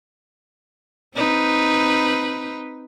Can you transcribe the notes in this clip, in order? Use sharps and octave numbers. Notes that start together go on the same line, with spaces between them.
C4 D#4 B4